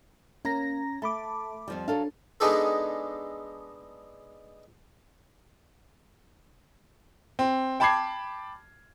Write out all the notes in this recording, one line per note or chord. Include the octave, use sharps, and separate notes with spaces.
A#3 C#4 A#5 A#6
A3 A5 B5 D6
F2 F3 G3
F#3 D4 A4 F5
G#3 B3 D4 D#4 G#4 A4
C4
G5 A5 B5 D6 G#6 C7